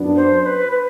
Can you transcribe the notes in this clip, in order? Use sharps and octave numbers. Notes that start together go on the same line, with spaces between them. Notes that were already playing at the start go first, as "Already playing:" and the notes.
Already playing: F#2 F#3 B3 D4
C5
C5
B4
B4